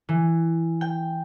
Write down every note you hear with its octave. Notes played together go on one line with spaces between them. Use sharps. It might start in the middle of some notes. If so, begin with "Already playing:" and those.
E3
G5